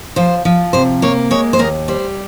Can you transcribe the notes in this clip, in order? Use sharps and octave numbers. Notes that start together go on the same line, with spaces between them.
F3 C5
F3
C3 C5
A#3 C#5
G#3 C#5
C5
D#2 A#4
G3 C5